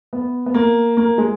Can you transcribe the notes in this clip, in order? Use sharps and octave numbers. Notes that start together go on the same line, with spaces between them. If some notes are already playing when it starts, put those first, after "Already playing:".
B3
B3
A#3
A#3
G#3